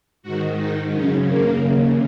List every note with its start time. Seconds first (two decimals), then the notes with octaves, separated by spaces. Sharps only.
0.23 G#2 D#3 F#4
0.57 D#4
0.93 F#2 C#3 C#4
1.28 A#3
1.63 D#2 C#3